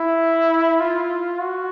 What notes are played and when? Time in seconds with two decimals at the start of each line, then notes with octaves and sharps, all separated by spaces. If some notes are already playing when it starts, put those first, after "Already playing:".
Already playing: E4
0.80 F4
1.39 F#4